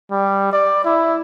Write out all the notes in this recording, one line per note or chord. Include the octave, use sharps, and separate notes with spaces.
G3
D5
E4